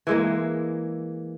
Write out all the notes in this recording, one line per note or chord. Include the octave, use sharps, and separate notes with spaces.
E3 G#3 A#3